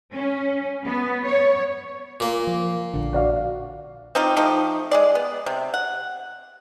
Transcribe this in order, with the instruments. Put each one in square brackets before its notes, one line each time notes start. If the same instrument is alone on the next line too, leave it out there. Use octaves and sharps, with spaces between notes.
[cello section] C#4
B3
C#5
[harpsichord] A#2 A#3
[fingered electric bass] F3
A#1 D3
[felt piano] F#4 D5 F5
[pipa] C4 D#4 F4 G4
F3 A3 D#4 G4
G#3 G#4 D5
B3
C3
F#5